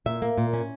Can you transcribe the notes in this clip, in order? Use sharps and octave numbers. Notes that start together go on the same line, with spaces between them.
A#2 E5
A#3
A#2
C#4